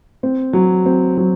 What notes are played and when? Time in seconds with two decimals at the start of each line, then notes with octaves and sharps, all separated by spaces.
0.23 C4
0.53 F#3
0.86 C4
1.17 F#3